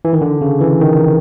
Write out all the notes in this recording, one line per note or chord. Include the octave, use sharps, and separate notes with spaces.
E3
D#3
D3
C#3
E3
D#3